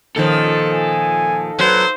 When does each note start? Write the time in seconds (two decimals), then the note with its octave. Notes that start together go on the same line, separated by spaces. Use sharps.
0.16 A#2 D#3 F3 C#4 A4
0.72 G#5
1.59 F#3 B4 C5